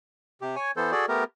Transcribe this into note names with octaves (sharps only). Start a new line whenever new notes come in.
C3 G4
C#5 G#5
E3 B3 A4 C5
F#4 G#4 A4 D5
A3 B3 G4 A#4